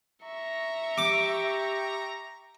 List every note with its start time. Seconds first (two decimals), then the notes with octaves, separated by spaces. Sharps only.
0.23 E5 A#5 C#6
0.98 G4 D6